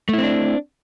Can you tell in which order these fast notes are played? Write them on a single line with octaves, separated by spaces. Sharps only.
A3 E4 C4 D4